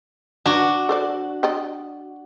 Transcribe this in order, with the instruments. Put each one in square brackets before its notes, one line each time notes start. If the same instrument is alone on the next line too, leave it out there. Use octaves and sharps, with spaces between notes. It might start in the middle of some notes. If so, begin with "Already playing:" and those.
[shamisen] F#3 D#4 [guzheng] D4 F#4
[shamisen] A4 C5 D5
D5 D#5 G5